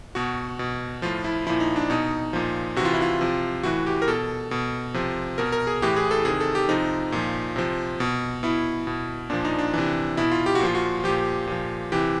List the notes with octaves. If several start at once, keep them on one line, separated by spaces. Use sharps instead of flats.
B2 F#4
B2
A2 F3 F4
E4
A#2 F3 E4
D#4
D4
B2 D#4
A#2 F3
C3 E3 F4 F#4
E4
F4
C3 F3
A2 E3 F#4
G4
A#4
B2 A4
B2
C3 F3
B2 A#4
A#4
G#4
A2 E3 G4
G#4
A4
C3 D#3 G#4
A4
G4
C3 F3 D#4
A#2 F3
C3 F3
B2
B2 E4
B2
A#2 F3 D4
D#4
D4
C3 E3
B2 E4
F4
G4
F#4
A#2 F3 F4
F#4
A#2 F3 G4
A#2 F3
C3 E3 G4